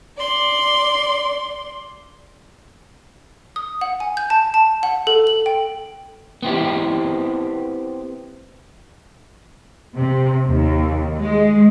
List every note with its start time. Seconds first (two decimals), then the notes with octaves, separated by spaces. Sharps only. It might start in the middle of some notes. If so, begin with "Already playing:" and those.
0.17 D5 C6
3.56 D#6
3.81 F#5
4.00 G#5
4.17 G6
4.30 A5
4.54 A5
4.83 F#5
5.07 A4
5.27 F#7
5.46 G5
6.43 B3 C4 E4 G4
9.97 C3
10.48 D#2
11.19 G#3